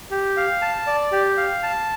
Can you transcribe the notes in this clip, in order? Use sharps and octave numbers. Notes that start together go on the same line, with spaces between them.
G4
F5
A5
D5
G4
F5
A5